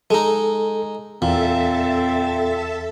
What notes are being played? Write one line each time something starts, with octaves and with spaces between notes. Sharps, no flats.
G#3 D#4 A4
E2 A#2 C4 A4 E5 A5